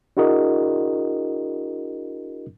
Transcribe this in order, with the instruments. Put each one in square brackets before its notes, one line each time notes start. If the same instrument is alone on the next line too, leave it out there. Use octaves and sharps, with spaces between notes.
[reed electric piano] D4 E4 F#4 G#4 A#4 D#5